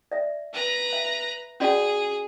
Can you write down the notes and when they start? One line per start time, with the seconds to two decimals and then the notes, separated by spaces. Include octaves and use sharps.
0.12 D5 E5
0.53 B4 A#5
0.93 E5
1.60 C#4 F#4 G#4 D5